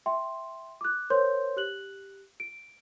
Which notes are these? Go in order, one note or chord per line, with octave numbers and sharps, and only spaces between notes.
E5 G5 C6
D6 F#6
A#4 C5 C#5 C6 G6
G4 F#6 F#7
D7